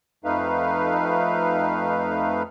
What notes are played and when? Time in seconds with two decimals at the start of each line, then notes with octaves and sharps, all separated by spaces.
0.24 F2 A3 D#4 B4 F5